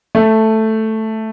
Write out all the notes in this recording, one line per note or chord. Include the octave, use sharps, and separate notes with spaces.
A3